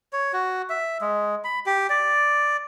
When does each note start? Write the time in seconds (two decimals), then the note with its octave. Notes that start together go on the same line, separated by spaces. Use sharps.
0.13 C#5
0.33 F#4
0.70 E5
1.01 G#3
1.44 B5
1.66 G4
1.90 D5